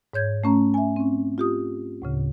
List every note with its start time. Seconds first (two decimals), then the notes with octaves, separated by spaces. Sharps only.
0.14 G#2 C#5 G6 G#6
0.44 A3 C#4 A#5
0.74 E5 G#5
0.96 C4 C#4
1.38 F4 G4 D#6
2.02 D2 A2 C#3